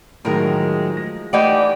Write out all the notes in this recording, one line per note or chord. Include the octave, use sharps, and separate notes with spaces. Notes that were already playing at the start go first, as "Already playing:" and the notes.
A2 D#3 F3 F#3 G#3 A#4 A#5
A#6
E3 A3 D#4 G4 D5 F#5 G6